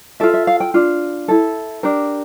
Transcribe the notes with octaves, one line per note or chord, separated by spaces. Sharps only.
F4 A4 E5
E5
F5
G5
D4 F4
E4 A4
D4 G4 A#4